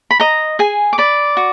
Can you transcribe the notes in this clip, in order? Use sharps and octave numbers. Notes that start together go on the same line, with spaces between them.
B5
D#5 A#5
G#4 G#5
D6
D5 B5
F#4